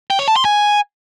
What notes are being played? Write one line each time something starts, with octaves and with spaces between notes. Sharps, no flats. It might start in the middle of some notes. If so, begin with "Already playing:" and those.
G5
C#5
A5
C6
G#5